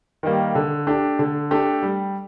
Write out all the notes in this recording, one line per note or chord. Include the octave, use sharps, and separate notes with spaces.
D#3 G3 A#3
D3
A3 D4 G4
D3
A3 D4 G4
G3